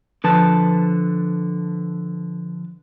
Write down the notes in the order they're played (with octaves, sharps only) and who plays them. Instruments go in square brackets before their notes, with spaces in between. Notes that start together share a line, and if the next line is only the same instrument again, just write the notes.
[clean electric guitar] D3 F3 B4 A5